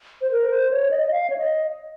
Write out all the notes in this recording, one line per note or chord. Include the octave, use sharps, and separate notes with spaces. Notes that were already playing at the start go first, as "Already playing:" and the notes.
C5
A#4
C5
C#5
D#5
D#5
F5
C#5
D#5